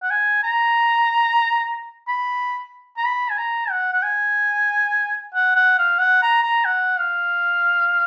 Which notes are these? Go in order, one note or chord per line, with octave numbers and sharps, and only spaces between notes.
F#5
G#5
A#5
B5
A#5
B5
G#5
A#5
F#5
F#5
G#5
F#5
F#5
F5
F#5
A#5
A#5
F#5
F5